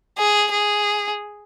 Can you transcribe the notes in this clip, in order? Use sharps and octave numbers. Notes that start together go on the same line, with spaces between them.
G#4
G#4